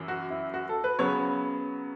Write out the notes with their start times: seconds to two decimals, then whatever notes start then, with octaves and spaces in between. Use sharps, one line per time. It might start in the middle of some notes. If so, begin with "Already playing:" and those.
Already playing: F#2 E3
0.08 F#4
0.30 E4
0.54 F#4
0.69 A4
0.84 B4
0.99 C#3 F#3 B3 C#5